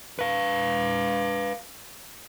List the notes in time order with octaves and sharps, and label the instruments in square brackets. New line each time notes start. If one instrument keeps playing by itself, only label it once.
[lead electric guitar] B4 F5